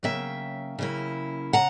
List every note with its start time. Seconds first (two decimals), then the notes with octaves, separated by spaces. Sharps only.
0.03 C#3 F#3 A#3 E5 G5
0.79 C#3 F#3 A#3 E4
1.53 C#3 F#5 A#5